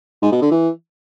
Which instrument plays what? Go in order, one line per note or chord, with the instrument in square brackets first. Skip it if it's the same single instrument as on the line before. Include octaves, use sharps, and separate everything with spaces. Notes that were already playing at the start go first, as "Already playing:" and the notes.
[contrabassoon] G#2
B2
D3
E3